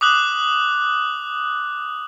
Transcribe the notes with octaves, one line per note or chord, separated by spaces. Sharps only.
D6 D#6 F#6 F#7